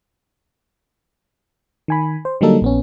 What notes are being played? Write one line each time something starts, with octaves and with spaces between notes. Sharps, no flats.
D#3 G#5 B5
C5
D3 F#3 G3 A#3 D#4 A4
A#1 B3 C#4